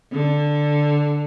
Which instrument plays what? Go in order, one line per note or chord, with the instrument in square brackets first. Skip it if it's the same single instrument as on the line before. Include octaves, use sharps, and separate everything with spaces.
[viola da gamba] D3